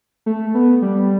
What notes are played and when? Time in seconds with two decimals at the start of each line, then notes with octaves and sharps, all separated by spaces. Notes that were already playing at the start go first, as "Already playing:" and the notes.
0.26 A3
0.54 B3
0.82 G3